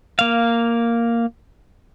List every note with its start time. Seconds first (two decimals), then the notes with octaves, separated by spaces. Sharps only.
0.19 A#3 F5